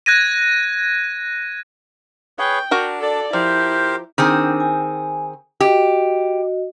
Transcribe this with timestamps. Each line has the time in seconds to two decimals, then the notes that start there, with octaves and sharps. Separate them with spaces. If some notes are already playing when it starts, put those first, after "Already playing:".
0.06 F#6 G#6 A#6 D#7
2.39 G#4 B4 C#5 G5
2.71 D4 F#4 A#4 F#5
3.01 A4 D5
3.33 F3 E4 G4 A#4 C5
4.18 D#3 C4 D4 G#4
4.60 G#5
5.60 F#4 G4 D#5